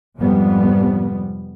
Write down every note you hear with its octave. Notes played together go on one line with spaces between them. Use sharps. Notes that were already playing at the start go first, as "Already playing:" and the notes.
F2 G#2 C3 F3 G3 B3